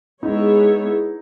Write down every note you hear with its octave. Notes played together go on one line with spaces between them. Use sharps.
G#3 B3 D#4 E4 G#4 C#5